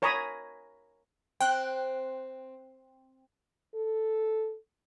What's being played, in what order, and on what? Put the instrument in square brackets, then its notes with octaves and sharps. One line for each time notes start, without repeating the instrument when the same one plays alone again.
[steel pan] A#4 C#5 G#5 A#5 B5 D#6
[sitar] C4 [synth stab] G5 F#6
[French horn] A4